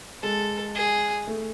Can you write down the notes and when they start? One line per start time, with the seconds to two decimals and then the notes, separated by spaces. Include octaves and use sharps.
0.23 G#3 A4
0.75 G#4
1.27 A3